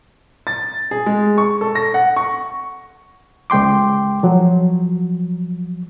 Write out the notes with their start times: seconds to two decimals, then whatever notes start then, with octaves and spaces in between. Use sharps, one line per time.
0.47 A6
0.91 G#4
1.06 G#3
1.38 C#6
1.61 A4
1.75 A#6
1.94 F#5
2.16 C#6
3.50 C#2 G#3 G5 C6 D6
4.23 F3 F#3